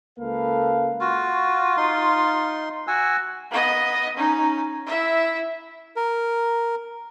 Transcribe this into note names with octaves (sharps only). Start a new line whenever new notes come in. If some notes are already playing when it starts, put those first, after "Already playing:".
C#2 A#3 A4 B4 F5
F4 F#4
D#4 C6
F#4 G#5 E6
B3 D#5
C#4 D#4
E4 E5
A#4